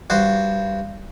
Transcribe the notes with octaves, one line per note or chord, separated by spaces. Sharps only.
G2 F#4 C5